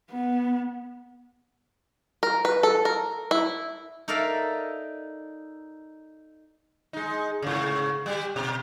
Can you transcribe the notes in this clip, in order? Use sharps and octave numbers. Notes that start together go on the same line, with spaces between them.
B3
A#4
B4
A4
A#4
E4
D#4 A4 A#4 D5 E5 F5
G#3 D#4
G#2 C#3
G3 G4
B2